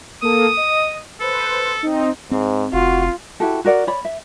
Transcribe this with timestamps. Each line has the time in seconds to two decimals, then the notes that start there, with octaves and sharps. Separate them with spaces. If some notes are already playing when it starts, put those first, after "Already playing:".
0.22 A#3 A4 D#6
0.57 D#5
1.20 A4 B4 C5
1.83 C4 D#4
2.31 G#2 C4
2.73 F1 F4 F#4
3.40 E4 F#4 G4 A4
3.65 F#4 A#4 D5 F#5
3.87 C#5 D5 B5
4.05 E5